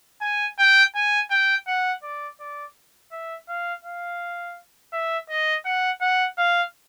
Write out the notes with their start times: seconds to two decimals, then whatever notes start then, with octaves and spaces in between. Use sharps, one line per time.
0.21 G#5
0.59 G5
0.95 G#5
1.31 G5
1.67 F#5
2.03 D5
2.40 D5
3.12 E5
3.49 F5
3.84 F5
4.93 E5
5.29 D#5
5.65 F#5
6.01 F#5
6.38 F5